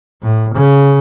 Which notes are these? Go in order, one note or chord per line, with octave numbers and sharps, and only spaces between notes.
A2
C#3